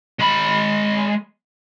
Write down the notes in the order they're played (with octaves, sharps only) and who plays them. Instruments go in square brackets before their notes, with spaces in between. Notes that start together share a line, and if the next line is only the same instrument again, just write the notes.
[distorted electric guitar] G#3 B5